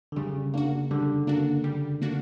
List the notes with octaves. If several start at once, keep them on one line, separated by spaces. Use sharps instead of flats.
D3
C#3 G3
A#3 D4 F#4
D3 G3
A#3 D4 F#4
G3
A#3 D4 F#4